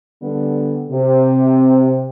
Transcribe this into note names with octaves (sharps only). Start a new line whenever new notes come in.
D3 G3 B3
C3